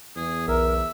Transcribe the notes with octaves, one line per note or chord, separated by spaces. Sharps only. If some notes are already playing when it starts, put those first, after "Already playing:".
E2 G#4
B1 A#4 E5